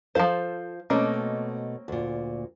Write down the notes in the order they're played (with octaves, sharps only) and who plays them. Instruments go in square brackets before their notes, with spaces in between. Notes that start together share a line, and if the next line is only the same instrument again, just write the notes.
[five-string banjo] F3 C5 [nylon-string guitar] A4 F5
[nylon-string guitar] B2 A3 D#5 [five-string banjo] A#3 C4 C#4
[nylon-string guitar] D2 A#2